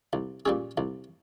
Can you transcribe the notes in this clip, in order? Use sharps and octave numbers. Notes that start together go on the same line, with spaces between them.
C2
A#2 G3 C#4 G#4
C2